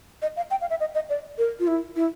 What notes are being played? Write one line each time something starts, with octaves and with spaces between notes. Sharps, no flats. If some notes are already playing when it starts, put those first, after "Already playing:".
D#5
F5
G5
F5
E5
D#5
D#5
D5
A#4
F4
E4
E4